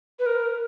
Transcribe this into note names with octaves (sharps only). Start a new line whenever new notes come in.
B4
A#4